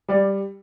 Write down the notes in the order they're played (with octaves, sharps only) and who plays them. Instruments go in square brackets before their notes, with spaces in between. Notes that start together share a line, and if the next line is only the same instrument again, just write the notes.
[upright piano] G3 D5